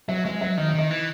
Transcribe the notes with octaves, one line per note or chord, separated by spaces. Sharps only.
F#3 E5
G#3 E5
F#3 E5
D#3 D#5
E5
D#3 D#5
E3